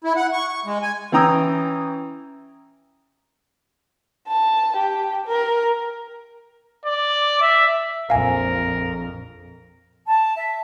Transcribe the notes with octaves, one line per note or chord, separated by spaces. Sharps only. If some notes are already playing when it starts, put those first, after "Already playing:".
E4
F#5
C#6
C#6
G#3
G#5
E3 C#4 G5 A#5 D#6 E6
A5
G4
A#4
D5
E5
A#1 F2 A#4 F5 G#5
A5
E5